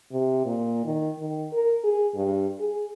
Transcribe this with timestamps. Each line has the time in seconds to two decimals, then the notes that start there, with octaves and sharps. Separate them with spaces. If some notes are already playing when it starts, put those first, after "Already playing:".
0.12 C3
0.46 A#2
0.85 D#3
1.19 D#3
1.53 A#4
1.84 G#4
2.15 G2
2.60 G#4